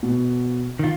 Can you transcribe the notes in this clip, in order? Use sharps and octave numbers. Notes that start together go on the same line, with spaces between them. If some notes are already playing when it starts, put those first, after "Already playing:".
B2
D#3 F4